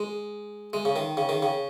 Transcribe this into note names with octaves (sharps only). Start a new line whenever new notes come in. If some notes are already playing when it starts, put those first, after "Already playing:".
Already playing: G#3
G#3
C#3
D#3
C#3
D#3
C#3